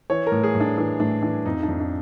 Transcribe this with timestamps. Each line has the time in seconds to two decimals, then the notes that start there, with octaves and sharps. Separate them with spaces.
0.10 E3 C#5
0.27 A#4
0.32 A2
0.43 G#4
0.55 A2
0.60 D4
0.77 E3 D4
1.00 A2 D4
1.22 E3 D4
1.45 F2 D#4
1.63 D4
1.68 F2
1.80 D4